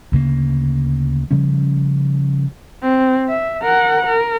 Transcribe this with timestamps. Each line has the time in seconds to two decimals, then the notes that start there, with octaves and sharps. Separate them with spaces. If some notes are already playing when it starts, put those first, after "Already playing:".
0.12 D2 C#3 A#3
1.31 C#3 F3 G3 C#4
2.82 C4
3.29 E5
3.62 A#4 F#5
4.05 A#4